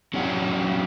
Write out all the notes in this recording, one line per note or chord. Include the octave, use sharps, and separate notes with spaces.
F#3 C#4 D4 G4 C#5 F#5